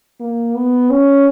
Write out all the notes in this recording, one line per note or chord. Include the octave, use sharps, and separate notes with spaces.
A#3
B3
C#4